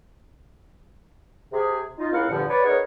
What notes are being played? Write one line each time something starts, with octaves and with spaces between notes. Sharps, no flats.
C3 G#4
D#4 F4
C#2 A#3 C4 E4 F5 F#5
E2 G2 A#2 D3 F3
B4 C#5 D5
B3 D#4 G#4 A#4 B4 C#5